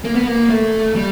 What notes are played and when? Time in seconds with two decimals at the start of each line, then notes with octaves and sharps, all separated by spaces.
0.05 A#3
0.15 B3
0.27 A#3
0.50 A3
0.95 G3